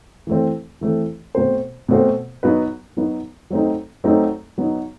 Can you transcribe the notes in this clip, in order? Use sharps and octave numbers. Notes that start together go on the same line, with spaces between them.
E3 A3 C4
E3 A3 C4
B2 A3 C4 F#4 C5
B2 A3 C4 F#4 C5
F#3 B3 D#4 F#4 B4
F#3 B3 D#4 F#4 B4
F#3 A3 C4 D#4
F#3 A3 C4 D#4
F#3 B3 D#4